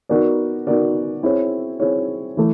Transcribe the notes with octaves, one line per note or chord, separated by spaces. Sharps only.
B3 D#4 F#4 A#4 D5
B3 D#4 F#4 A#4 D5
C4 E4 G#4 C#5
C4 E4 G#4 C#5
E3 A3